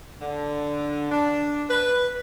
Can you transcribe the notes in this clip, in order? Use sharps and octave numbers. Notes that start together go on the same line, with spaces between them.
D3
D4
B4